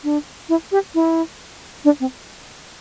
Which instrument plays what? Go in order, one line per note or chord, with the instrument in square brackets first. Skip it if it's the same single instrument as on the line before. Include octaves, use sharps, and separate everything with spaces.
[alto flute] D4
E4
G4
E4
D4
C4